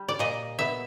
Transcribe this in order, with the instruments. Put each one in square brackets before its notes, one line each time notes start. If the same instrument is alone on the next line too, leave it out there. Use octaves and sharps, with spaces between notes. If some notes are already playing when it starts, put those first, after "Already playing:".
Already playing: [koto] G3
D5
A#2 D#5
B3 E5